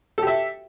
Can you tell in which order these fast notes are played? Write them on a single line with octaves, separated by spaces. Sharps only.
A4 G4 E5